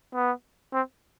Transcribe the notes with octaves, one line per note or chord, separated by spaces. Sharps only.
B3
C4